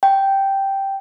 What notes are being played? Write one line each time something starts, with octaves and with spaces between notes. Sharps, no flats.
G5